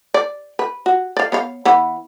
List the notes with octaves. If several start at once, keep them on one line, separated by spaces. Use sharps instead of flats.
D5
B4
F#4
D5 F5
B3 C#5 F5
E3 B3